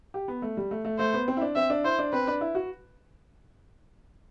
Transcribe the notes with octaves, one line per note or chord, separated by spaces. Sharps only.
G4
B3
A3
G3
A3
A3
A3 C5
B3
C4
E4
D4
C4 E5
D4
E4 C5
D4
C4 B4
D4
E4
F#4